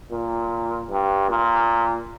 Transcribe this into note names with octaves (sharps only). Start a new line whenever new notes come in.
A#2
G2
A#2